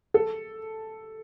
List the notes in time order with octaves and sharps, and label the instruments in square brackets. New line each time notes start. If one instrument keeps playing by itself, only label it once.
[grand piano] A4